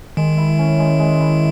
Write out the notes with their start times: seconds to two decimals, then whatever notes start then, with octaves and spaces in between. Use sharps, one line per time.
0.17 D#3 G#3
0.37 E4
0.59 C#4
0.79 G#3
0.99 G#3
1.20 E4